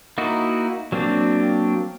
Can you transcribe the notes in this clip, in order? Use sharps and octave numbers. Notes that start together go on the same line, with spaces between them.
A#3 D#4 E4 F#4
F#3 A#3 C4 D4